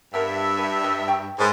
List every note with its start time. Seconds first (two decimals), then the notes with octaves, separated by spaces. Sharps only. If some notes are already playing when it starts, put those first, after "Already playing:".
0.14 G2 B3 A#4 E5
0.58 B4
0.84 B4 D#5
1.08 G5 A#5 C#6
1.39 G#2 G#4 B4 C#5